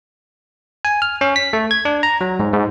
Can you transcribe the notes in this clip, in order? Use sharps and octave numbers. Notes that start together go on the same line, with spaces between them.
G#5
F6
C#4
B6
A3
G#6
D4
A#5
F#3
G#2
G#2